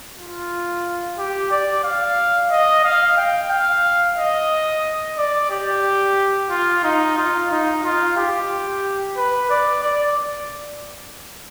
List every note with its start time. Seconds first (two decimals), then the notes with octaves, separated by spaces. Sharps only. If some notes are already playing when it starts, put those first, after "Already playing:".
0.18 F4
1.18 G4
1.51 D5
1.84 F5
2.51 D#5
2.84 F5
3.17 G5
3.51 F5
4.17 D#5
5.17 D5
5.51 G4
6.50 F4
6.84 D#4
7.18 F4
7.51 D#4
7.83 F4
8.17 G4
9.17 B4
9.50 D5
9.83 D5